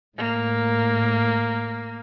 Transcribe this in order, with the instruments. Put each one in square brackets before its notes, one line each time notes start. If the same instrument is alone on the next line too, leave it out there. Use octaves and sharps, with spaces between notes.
[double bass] A2 [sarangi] A#3